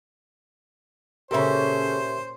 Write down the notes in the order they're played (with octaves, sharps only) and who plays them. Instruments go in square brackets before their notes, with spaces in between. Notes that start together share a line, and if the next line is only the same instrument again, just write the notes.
[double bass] A#2 C#4 [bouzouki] C#3 A4 [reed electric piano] G4 A#4 E5 [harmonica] C5